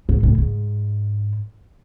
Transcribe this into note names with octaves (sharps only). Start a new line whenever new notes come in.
G#2
A2
G#2